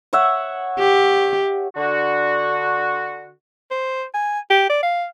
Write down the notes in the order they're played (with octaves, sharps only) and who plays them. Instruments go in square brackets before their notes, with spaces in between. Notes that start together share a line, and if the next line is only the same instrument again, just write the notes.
[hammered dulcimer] C#5 E5 F#5
[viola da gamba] G4
[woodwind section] D3 F#4
[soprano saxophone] C5
G#5
G4
D5
F5